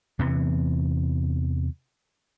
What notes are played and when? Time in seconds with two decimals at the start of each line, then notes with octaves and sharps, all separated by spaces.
0.19 E2 C3 E3 B3